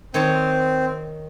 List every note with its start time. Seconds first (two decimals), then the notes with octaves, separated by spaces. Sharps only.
0.14 D#3 C4 C#5 A5